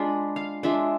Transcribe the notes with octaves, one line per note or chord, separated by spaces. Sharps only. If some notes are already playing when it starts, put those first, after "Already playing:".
Already playing: G#3 D4 F4 B5
F5
G#3 D4 F4 E5